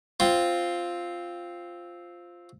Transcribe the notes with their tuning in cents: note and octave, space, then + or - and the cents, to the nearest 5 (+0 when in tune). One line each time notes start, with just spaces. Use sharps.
C4 +0 F4 +0